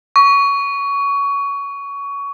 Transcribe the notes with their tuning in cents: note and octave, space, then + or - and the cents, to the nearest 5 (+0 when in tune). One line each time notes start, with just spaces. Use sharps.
C#6 +20